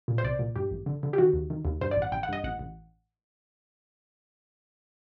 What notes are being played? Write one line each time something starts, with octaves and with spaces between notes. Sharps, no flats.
A#2
C5
C2 D5
A#2
G2 G4
A1
D3
D3
G4
D#3 F#4
D#2
D#3
D#2
G2 C5
D5
A1
F#5
A1 G5
F#5
G2 D#5
A1 F#5
A1